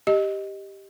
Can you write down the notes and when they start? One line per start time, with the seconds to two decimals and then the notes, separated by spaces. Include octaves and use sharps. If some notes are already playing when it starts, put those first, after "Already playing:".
0.07 G4 D#5